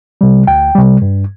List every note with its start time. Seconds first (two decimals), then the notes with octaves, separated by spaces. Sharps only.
0.21 C3 G3
0.47 D2 G5
0.75 C3 G3
1.02 G2